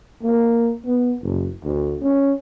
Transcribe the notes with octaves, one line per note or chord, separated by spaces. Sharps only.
A#3
B3
F#1
D2
C#4